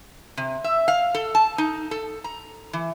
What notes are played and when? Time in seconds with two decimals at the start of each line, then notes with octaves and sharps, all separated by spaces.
0.37 C3
0.64 E5
0.88 F5
1.14 A4
1.35 A5
1.58 D#4
1.91 A4
2.24 A#5
2.73 E3